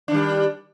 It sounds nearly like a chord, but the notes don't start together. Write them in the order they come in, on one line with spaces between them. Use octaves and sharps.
D4 D#3 G3